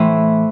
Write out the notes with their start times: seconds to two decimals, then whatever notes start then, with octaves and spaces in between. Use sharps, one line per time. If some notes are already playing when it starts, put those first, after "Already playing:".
Already playing: A2 E3 C5